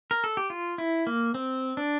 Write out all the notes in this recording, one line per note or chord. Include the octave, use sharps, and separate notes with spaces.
A#4
A4
G4
F4
E4
A#3
C4
D4